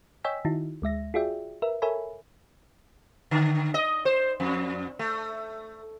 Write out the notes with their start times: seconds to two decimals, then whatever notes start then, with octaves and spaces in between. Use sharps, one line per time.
0.24 C#5 D#5 G5 G#5 E6 B6
0.45 D#3 D#4 E4 F#4
0.82 D2 G#3 E5 A#6
1.14 F4 F#4 G#4 D5 E5 G5
1.62 A#4 B4 E5
1.82 A4 A#4 C#5 E5 G#5 B5
3.31 D3
3.74 D#5
4.05 C5
4.40 F2
4.99 A3